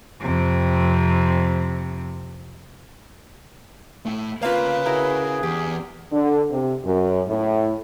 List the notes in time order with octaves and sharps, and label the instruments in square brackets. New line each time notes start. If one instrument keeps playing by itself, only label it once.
[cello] F2 C3
[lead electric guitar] A3 E4
[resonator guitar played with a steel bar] A#3 C4 F4 [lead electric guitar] C#4 F5 [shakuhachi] B4
[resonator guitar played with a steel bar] E4 F#4 A#4 [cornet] G#4
[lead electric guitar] E2 [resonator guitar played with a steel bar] G4
[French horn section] D3
C3
F#2
A2